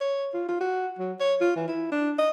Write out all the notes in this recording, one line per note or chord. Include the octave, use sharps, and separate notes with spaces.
C#5
F4
F4
F#4
F#3
C#5
F4
E3
E4
D4
D#5